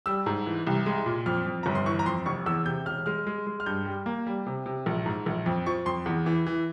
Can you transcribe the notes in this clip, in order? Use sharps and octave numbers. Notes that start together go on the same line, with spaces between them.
G3 E6
G#2
E3
C2
G#3
A#2
F2 F6
F2
G1 A#5
C6
E3 C#6
A#5
F2 C6
F1 C#6
E2 E6
C3 G6
E1 F6
G#3 F6
G#3
G#3
F6
G2 G6
G3
A#3
G3
C3
C3
A#1
G#2
A#1
F2
F3 C#6
F2 C6
E2
E3
E3